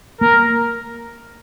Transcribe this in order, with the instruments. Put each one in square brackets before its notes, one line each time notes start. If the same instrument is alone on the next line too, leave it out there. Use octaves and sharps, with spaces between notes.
[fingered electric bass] A#3 [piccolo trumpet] A#4